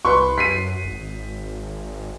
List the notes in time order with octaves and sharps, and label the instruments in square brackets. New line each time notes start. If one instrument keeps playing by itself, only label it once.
[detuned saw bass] C2 [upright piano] B4 C6 C#6
[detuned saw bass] F#2 [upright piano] B6 C7 D#7
[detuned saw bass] G#1